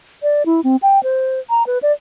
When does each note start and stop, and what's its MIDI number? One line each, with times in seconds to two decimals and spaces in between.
0.23 0.43 74
0.46 0.61 64
0.64 0.76 60
0.82 1.02 79
1.03 1.40 72
1.50 1.66 82
1.67 1.78 71
1.83 1.92 74